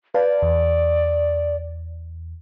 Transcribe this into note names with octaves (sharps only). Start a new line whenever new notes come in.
B4 D5 F5 A5
E2